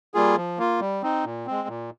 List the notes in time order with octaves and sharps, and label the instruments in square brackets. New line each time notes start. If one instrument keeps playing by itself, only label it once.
[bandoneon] G3 A#3 F4 G#4
F3
A#3 F4
G3
C4 D#4
A#2
G#3 C4
A#2